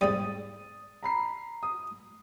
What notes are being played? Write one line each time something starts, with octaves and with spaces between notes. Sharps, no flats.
G#2 C3 G3 D#6 A6 D#7
A#5 B5 C7
D#6